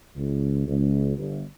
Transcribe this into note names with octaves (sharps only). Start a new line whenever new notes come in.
C#2
C#2
G1